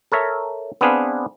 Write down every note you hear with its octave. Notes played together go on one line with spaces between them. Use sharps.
A4 A#4 C#5 E5
B3 C4 D4 G#4 B4 F5